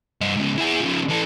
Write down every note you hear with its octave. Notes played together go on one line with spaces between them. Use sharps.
G2 D#5
G#2 C#3
E4 G#4
C#3 F3
E3 A4